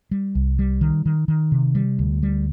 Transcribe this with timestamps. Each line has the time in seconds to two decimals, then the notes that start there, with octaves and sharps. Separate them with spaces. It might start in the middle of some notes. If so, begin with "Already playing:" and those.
0.11 G3
0.35 C2
0.59 G3
0.81 D#3
1.06 D#3
1.28 D#3
1.52 C3
1.75 G3
1.99 D2
2.23 G3